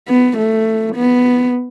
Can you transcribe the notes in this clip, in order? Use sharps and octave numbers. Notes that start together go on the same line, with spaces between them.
B3
A3
B3